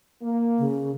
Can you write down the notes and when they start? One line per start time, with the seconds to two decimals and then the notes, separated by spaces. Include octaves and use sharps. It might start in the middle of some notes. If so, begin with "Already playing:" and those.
0.22 A#3
0.58 C#3